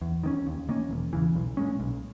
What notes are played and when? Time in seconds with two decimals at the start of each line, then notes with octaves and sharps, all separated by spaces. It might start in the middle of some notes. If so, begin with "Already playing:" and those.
0.01 E2
0.23 D#3 A#3 C#4
0.47 D#2
0.69 D#3 A#3 C#4
0.91 E1
1.13 E2 C#3 E3
1.35 B1
1.57 A#2 G#3 C#4
1.80 B1